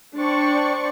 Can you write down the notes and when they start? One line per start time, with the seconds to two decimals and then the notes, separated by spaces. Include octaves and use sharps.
0.17 D4 C5 D5 G5 C#6